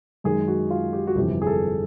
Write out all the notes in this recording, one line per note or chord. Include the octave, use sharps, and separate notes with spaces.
F#2 D#3 G#3 G#4
F#4
F4
G4
F#4
G1 F2 C3 E3 G4
G#4
A4